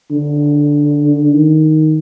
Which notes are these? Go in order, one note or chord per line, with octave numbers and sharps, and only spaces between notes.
D3
D#3